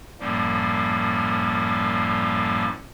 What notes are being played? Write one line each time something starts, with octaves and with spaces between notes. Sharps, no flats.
F#2 A2 F3 G3 A#3